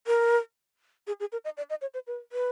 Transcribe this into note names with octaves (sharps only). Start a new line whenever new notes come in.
A#4
G#4
G#4
A#4
D#5
D5
D#5
C#5
C5
B4
B4